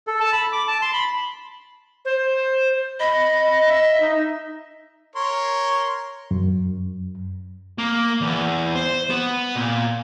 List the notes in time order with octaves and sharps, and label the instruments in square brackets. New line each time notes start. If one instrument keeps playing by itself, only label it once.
[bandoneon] A4
A5
B5
D6
A5
C6
B5
[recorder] C5
[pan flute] D#5 [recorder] B5
[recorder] E5
D#4
[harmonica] A#4 C#5 C6
[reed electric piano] F#2
[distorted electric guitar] A#3
E2
C5
B3
A#2